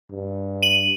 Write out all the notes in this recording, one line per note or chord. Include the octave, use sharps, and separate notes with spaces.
G2
D#7 F#7